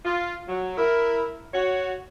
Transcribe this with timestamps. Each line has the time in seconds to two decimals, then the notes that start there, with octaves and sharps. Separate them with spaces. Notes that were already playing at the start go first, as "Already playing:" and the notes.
0.05 F4
0.48 F#3
0.78 E4 A#4
1.54 F#4 C#5